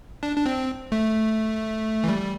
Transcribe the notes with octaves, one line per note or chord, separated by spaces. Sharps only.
D4
D4
C4
A3
E3
G3